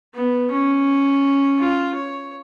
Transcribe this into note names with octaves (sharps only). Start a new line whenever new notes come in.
B3
C#4
F4
C#5